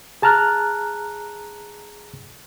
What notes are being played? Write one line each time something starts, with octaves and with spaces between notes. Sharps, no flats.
G#4 A5 A#5 F6 F#6